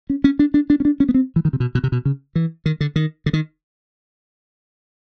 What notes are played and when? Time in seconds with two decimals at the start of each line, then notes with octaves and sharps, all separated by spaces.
0.10 C#4
0.24 C#4
0.39 D4
0.54 D4
0.70 D4
0.80 C#4
0.85 D4
1.00 C#4
1.09 B3
1.14 C4
1.36 E3
1.45 D#3
1.53 C3
1.60 B2
1.75 B2
1.84 C3
1.92 B2
2.05 C#3
2.35 E3
2.66 D#3
2.81 D3
2.96 D#3
3.26 D3
3.33 D#3